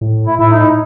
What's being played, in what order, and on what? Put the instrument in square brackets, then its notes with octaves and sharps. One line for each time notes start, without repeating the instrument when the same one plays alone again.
[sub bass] A2
[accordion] E4
[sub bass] A2 [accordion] E4
[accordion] D#4